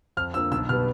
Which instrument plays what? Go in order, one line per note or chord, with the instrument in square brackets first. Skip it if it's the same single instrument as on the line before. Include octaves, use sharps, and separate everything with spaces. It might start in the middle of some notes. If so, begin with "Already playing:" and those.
[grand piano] F2 F6
D3 F3 A#3 E6
B1 E6
B2 G3 B3 F6